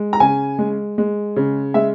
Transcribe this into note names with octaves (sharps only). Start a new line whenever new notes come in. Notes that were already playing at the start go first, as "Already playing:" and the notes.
Already playing: G#3
A#5
C#3 G#5
G#3
G#3
C#3
G#3 E5